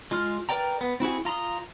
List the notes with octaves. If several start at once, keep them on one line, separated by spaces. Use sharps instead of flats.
G#3 F4 C6 F6
A#4 B4 D5 G5 A#5
B3
C4 E4 F#4 G#4
F4 A#5 C6 D#6